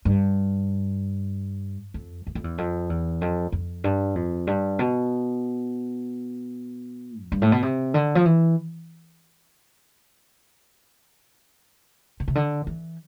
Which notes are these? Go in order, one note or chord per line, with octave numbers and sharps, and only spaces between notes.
G2
F2
E2
F2
E2
F2
E2
F2
F2
G2
F2
G2
B2
F2
G2
A2
B2
C3
D3
F3
E3
B2
C3
D3
E3